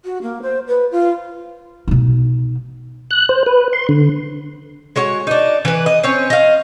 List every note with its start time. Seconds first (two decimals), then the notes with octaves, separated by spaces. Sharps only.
0.04 F#4
0.22 A#3
0.41 C5
0.67 B4
0.91 F4
1.88 B2 D#4
3.11 F#6
3.29 C5
3.46 B4
3.73 C6
3.89 D3
4.96 G#3 F#4 C#5
5.27 D4 D#4
5.65 E3 B4
5.86 D#5
6.03 C4 C#4 C#5
6.30 D#5 F5